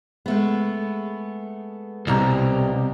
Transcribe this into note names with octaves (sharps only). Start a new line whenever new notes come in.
G#3 A3 B3
C2 B2 G3 A#5